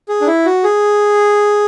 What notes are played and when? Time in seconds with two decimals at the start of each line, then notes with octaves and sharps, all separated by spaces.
0.09 G#4
0.21 D4
0.27 E4
0.46 F#4
0.64 G#4